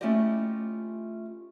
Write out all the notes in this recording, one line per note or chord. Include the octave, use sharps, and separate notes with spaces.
A3 C#4 E4 F4 G4 D#5